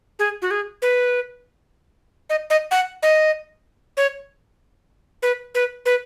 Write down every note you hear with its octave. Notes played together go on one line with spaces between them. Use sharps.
G#4
F#4
G#4
B4
D#5
D#5
F#5
D#5
C#5
B4
B4
B4